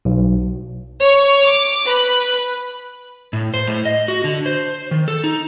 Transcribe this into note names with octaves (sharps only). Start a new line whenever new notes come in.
B1
C#5 C#6
D6
B4 B5
A2
C5
A2
D#5
F#4
D3
C5
D#3
A4
D#4